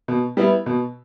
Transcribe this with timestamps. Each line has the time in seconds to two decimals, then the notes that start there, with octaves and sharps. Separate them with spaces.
0.08 B2
0.37 G3 B3 E4
0.66 B2